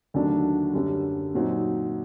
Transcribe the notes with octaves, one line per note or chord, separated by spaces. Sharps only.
D#2 D3 F#3 A3 D4
F#2 D3 G3
A#2 F#3 C4 D#4